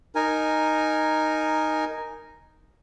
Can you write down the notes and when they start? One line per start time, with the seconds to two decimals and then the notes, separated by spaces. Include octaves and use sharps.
0.15 D#4 A#4 G#5